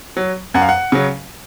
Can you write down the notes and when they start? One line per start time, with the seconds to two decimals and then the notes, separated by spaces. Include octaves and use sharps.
0.17 F#3
0.54 F#2 F#5
0.62 F5
0.69 F#5
0.92 C#3 F#3